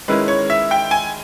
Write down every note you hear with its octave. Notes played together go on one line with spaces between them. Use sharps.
D#3 G#3 C#4 E4 B4
C#5
E5
G5
G#5